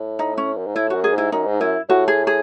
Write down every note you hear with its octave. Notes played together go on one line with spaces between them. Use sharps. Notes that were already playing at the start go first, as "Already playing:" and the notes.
Already playing: A2
D#4
C#4
F#2
G#2
A2 E4
F#2 F#4
G#4
G#2 E4
F#2 D#4
G#2
F#2 E4
A2 F#4
G#4
G#4